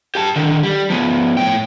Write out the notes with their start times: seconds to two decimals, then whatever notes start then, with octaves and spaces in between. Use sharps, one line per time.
0.15 G4 A5
0.36 D3 D#3
0.63 G3
0.90 F3 B3
1.37 A2 G5